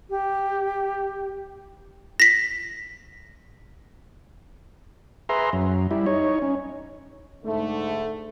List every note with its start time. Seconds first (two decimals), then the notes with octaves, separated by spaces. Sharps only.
0.10 G4
2.20 A#6 B6
5.29 G#4 B4 E5 A#5 C6
5.53 F#2
5.91 G3 E4
6.06 D#4 C#5
6.42 C#4
7.45 G#2 D3 A3